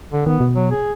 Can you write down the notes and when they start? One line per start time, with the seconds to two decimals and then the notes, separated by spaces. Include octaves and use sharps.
0.12 D3
0.26 D#3 B3
0.40 B2
0.55 F#3
0.70 G#4